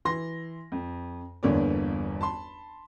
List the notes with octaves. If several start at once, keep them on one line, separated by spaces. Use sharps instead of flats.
E3 C6 A#6
F2
G1 E2 D3 A#3 C#5 D5
A5 B5 C6